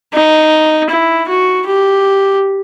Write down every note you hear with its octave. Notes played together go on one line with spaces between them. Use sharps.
D#4
E4
F#4
G4